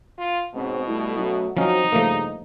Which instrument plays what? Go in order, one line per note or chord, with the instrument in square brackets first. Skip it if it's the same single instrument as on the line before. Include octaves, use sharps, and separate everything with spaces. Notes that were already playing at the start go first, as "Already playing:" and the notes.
[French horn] F4
[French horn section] G#2 C4 C#4 [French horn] B2
[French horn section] G3 A3 E4
F#3 A3 C#4
[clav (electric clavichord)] F3 C#4 [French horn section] F#3 C4 [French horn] D#4
[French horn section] G2 C#3 [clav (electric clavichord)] F3 A3 A#3